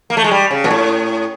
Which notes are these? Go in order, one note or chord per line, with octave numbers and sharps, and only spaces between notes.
A#3
A3
G#3
G3
C#3
A#2
A2